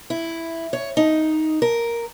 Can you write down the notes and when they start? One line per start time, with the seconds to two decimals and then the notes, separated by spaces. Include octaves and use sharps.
0.10 E4
0.73 C#5
0.97 D#4
1.62 A#4